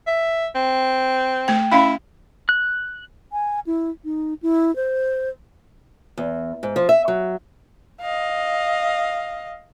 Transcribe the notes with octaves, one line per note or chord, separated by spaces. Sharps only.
E5
C4
A3 G5
C#4 E4 F5 B5
F#6
G#5
E4
D#4
E4
C5
E2
G#2
F3
E5
F#3
D#5 F5